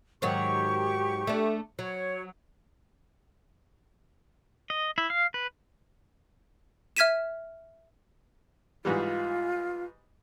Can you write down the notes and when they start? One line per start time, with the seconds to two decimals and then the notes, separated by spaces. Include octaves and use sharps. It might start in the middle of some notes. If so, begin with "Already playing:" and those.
0.22 G#2 D#3 F#3 G4 C#6
1.27 A3 D4
1.79 F#3 C#5
4.70 D#5
4.98 E4
5.10 F5
5.34 B4
6.97 E5 F6 G#6 B6 D#7 E7
8.85 G#2 E3 G3 F4